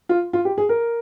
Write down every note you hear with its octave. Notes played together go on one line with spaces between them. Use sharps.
F4
F4
G4
G#4
A#4